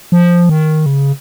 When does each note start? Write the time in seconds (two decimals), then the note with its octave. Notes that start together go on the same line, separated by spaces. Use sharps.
0.12 F3
0.49 D#3
0.86 C#3